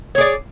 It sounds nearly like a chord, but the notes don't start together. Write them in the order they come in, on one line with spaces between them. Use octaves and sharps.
C#5 G#4 D5